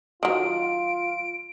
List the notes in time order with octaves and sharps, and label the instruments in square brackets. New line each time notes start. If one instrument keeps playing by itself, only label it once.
[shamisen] D#3 F#3 [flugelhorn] F4 [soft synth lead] D7